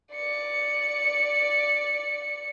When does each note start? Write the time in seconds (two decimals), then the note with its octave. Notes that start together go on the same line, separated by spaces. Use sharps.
0.14 D5 C#7